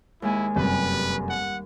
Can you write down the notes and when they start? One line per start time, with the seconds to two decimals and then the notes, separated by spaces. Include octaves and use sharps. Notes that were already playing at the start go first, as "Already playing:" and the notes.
0.22 D#2 G#3 E4 G#5
0.56 F1 F#2 G3 B4
1.29 F#5